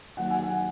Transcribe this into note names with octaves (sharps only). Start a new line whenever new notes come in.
D#3 F#3 A#3 F#5
G#5
F#5